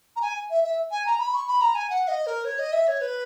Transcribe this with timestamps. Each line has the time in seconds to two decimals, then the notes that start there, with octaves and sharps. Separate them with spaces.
0.16 A#5
0.21 G#5
0.50 E5
0.63 E5
0.91 G#5
1.06 A#5
1.19 B5
1.34 C#6
1.47 B5
1.61 A#5
1.75 G#5
1.90 F#5
2.08 D#5
2.26 A#4
2.44 C#5
2.59 D#5
2.72 E5
2.87 C#5
3.01 B4